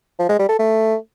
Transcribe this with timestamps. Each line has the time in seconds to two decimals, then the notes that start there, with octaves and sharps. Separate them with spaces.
0.19 F3
0.29 G#3
0.39 G3
0.49 A4
0.59 A3